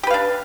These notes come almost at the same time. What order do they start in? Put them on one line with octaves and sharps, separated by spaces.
G4 B4 F5 D4